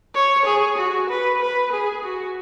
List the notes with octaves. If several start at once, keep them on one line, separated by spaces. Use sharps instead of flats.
C#5
G#4
F#4
B4
B4
G#4
F#4